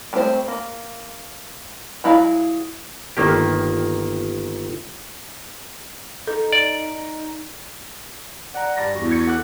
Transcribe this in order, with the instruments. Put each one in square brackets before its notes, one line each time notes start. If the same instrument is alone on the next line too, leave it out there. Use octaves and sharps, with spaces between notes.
[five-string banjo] G3 A3 C4 F#4 C5
A#3
F#3 E4 G#4 F5 A#5
[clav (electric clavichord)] G1 D#3 A#3 G4
[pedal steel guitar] D#4 [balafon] A4
[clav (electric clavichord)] D5
[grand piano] D5 A#5 [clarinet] F#5
[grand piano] G2 A#6 [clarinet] D5
[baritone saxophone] E2 [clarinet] F#4
[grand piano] C#6 G#6 C#7
[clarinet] A4 [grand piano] F#5 D6 F#6